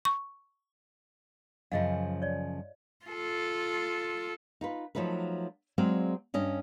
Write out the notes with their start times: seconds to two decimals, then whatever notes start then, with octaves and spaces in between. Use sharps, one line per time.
0.05 C#6
1.72 F#2 C#3 F3 F4 D#5 F5
2.22 C#5 D5
3.06 F4 A4
4.61 D#4 F4 B4
4.95 F3 F#3 A3 D#4 B4
5.78 F#3 G#3 C4 D5 F5
6.34 G2 C#4 D#5